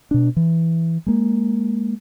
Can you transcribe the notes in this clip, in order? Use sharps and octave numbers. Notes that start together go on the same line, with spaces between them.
B2 D4
E3
G#3 A#3